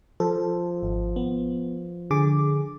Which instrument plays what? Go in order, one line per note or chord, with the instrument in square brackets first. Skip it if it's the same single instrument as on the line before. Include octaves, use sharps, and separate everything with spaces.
[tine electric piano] F3 [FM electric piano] A4
[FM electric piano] G#1
B3
D3 G#4 D6